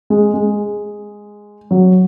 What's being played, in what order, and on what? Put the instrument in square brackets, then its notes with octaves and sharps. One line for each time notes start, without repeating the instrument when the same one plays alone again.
[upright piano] G#3
G#3
F#3